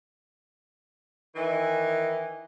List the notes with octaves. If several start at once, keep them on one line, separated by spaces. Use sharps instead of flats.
D#3 E3